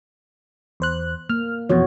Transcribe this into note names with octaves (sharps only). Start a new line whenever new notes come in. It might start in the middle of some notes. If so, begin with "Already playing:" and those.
E2 C5 F#6
A#3 F6
F2 B2 E3 F#4 C#5